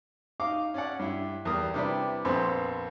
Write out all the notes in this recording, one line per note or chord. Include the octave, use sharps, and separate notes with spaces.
D#4 F5 D6
C#4 D5 F#5
G2 E4
E2 G3 A#4 D#6
C3 G3 D4 E4 B4
A#1 F2 B3 C5 B5 C6